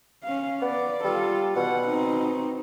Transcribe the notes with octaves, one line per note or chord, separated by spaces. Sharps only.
C#4 F5
B3 D5
G3 F4 A4
B2 F#5
C4 D#4